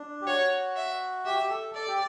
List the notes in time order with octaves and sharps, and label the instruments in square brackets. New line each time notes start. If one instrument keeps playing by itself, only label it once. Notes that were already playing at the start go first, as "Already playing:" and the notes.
Already playing: [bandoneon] D4
G4
[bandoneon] F#4 [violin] C#5
[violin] E5
[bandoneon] G4 [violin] E5
[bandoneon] G4
A4
[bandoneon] A4 [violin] D5
[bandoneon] G4